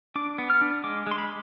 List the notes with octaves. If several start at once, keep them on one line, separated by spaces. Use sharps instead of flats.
D4 D6
B3
F6
D4
G#3 D6
G#3 C6
B5